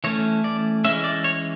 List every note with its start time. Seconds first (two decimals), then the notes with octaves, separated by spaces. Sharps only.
0.04 E3 A3 C#4 C#5
0.44 D5
0.85 E3 G#3 C#4 E5
1.04 D5
1.24 C#5